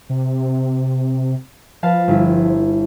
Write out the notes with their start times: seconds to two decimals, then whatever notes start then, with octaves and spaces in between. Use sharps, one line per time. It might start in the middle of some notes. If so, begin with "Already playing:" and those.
0.10 C3
1.83 F3 B4 F5 A5
2.08 G1 E4